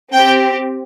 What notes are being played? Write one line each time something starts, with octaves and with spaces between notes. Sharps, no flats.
C4 G4 G5